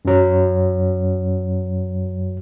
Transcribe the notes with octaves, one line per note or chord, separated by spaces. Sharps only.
F#2 F#3